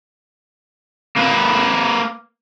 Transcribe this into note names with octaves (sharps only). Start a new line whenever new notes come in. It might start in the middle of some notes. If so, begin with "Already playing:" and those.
A#3 B4